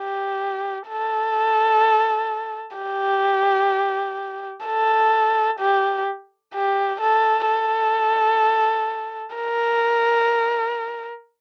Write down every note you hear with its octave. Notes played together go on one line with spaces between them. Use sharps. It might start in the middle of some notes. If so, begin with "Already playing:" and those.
Already playing: G4
A4
G4
A4
G4
G4
A4
A4
A#4